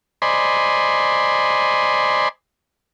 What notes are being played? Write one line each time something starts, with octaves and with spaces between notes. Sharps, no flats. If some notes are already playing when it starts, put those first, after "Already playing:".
C5 D5 D#5 G#5 B5 C6